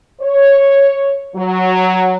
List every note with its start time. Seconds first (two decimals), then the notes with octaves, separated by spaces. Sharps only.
0.21 C#5
1.36 F#3